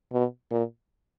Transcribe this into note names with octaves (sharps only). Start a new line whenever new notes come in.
B2
A#2